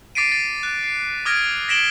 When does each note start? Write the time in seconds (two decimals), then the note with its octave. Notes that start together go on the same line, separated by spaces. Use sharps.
0.15 D6 A6 B6 C7 D7 D#7
0.32 A6
0.63 F#6
0.83 C7
1.25 D6 D#6 F6 G#6 A#6 D7
1.69 A#6 B6 D7 E7 F#7 G7